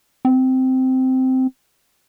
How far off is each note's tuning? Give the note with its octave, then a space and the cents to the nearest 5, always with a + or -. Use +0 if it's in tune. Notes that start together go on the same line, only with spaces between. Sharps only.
C4 -10